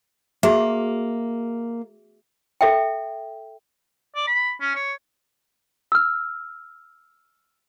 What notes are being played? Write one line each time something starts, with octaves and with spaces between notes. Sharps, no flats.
A#3 F#4 G#4 E5
A4 E5 G5
D5
B5
C#4
C#5
E6 F6